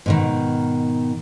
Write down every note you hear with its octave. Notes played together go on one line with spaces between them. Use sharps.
G#2 B2 D#3